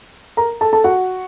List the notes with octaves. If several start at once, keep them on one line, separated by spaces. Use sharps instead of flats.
A#4 A#5
A4 A5
A4 A5
F#4 F#5